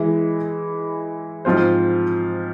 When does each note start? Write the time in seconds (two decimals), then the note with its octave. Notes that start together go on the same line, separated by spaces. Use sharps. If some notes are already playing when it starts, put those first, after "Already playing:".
Already playing: E3 G#3 E4
1.45 G#2 F3 C4 F4 C5